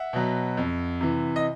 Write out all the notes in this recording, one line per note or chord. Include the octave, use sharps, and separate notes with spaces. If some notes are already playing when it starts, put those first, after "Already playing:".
Already playing: E5 F#5
B2 F#3
F2
C3 E3
D#5